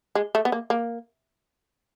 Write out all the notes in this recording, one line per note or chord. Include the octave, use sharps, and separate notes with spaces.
G#3
A3
B3
A#3
A#3